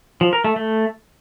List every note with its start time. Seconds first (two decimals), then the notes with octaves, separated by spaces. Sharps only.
0.21 F3
0.33 A#4
0.44 A3
0.56 A3